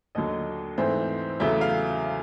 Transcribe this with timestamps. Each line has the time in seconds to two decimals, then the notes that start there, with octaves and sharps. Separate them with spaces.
0.15 D#2 D3 F#3 D#5
0.78 G#2 E3 A3 C4
1.40 E2 C#3 F#3 A3 E5
1.61 F5